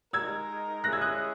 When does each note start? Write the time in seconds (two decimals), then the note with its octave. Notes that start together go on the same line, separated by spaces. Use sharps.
0.13 G#3 D#4 A#4 E6 G#6
0.84 G#3 C#4 E4 G#4 F#6 A#6
0.92 E6 G#6
1.01 D#6 F#6